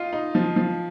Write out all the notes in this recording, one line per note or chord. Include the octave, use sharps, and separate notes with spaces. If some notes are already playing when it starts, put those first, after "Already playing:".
Already playing: D#4 F4
D#4
F3
F3